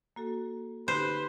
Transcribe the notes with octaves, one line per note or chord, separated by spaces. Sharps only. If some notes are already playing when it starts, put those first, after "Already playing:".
A#3 F#4 A4
D3 D#4 G4 B4 C5